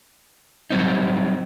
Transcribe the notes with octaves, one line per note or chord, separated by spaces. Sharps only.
F#3 G3 C4 D#4